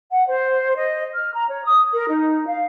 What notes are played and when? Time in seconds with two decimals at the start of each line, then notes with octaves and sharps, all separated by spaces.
0.11 F#5
0.27 C5
0.76 D#5
1.13 F6
1.33 A#5
1.48 C#5
1.64 D#6
1.92 A#4
2.08 D#4
2.47 F5